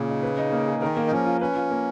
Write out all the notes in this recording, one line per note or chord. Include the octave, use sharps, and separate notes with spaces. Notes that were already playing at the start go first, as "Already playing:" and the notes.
Already playing: A#2 C#3
D#4
B4
D#4
A#3
G#4
D#3 A#4
A#3
D#4
F3 C#4
F4
C#4 B4
F4
A#3